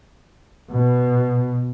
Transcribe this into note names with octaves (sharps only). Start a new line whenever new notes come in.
B2